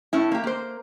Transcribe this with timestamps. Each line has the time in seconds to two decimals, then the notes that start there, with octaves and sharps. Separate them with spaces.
0.13 A2 C#4 E4
0.32 A#3 G4
0.44 A#3 C5